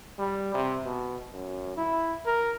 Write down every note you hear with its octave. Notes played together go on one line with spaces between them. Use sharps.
G3
C3
B2
F#2
E4
A#4